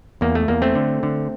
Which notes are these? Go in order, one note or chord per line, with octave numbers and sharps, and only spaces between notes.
E2 A#3
A3
E2 A#3
A3 C4
D3
D3